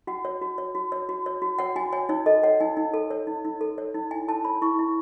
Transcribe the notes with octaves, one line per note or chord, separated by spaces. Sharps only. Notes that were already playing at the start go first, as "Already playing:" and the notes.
F#4 F#5
C#5
F#4
C#5
F#4
C#5
F#4
C#5
F#4
C#5 F#5
F#4 G#5
C#5 G#5
D#4 C#5
A4 D#5
C#5 F#5
D#4 G#5
D#4
A4
C#5
D#4
D#4
A4
C#5
D#4
E4 G#5
A4 A5
C#5 B5
E4 C#6
E4